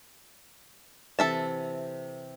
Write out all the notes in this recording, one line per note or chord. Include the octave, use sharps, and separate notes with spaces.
C3 E3 A4 E5 A5